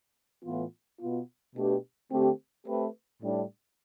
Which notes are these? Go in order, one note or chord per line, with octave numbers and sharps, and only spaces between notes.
A2 E3 B3 F4
B2 B3 F4
B2 A3 D4 G4 B4
D3 A3 C4 G4
A3 C4 G4 B4
A2 G3 D4